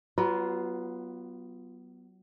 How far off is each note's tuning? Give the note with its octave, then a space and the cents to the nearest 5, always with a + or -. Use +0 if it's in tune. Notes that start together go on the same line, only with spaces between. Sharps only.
F#3 +30 B3 +0 F4 -5